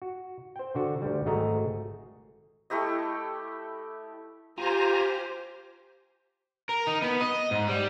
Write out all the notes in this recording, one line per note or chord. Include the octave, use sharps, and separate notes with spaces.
F#4
C5 G5
D3 F#4
D2 G3
G#1 A3 F#4 G#4 D#5 A#5
A3 E4 G4 D#5
F4 G4 C5 G#5 A#5
A#4
D#4
B3
D#5
G#2
G3